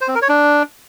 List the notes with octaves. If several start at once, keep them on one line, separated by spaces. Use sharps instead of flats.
C5
C4
A#4
C#5
D4